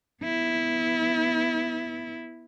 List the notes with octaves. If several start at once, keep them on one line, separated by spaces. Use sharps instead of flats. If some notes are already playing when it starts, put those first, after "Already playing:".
B3 E4